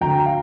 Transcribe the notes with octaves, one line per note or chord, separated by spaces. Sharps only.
D2 G5 A#5
F5